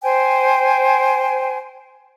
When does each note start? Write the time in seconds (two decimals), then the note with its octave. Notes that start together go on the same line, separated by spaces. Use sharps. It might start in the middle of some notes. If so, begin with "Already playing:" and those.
0.03 C5 G5 G#5